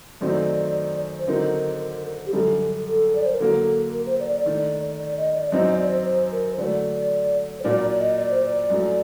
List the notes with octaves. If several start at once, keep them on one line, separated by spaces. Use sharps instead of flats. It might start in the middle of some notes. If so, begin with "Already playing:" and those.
F#2 D#3 F#3 A3 C4 D5
C5
D3 F#3 C4 D#4 A#4
G4
F#2 D3 G3 D4 A4
A4
D5
C5
A#4
D3 F#3 A#3 A4
A#4
C5
D5
D5
D#3 A3 D4
D5
D#5
D5
F#2 F#3 C4 D#4 D#5
D5
C5
C5
A#4
C5
D3 F#3 A3 D5
C5
A#2 F#3 A#3 D4 D5
D5
D#5
D5
C5
D5
F#2 F#3 A3